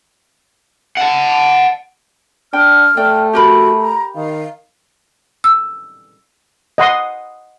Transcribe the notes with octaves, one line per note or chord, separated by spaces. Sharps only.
F#5 A5
D4 G5 F6
A3 D5 G5
F#4 G4 A#4 B5
A#5
D#3 F5
E6
D#5 F#5 C6 D#6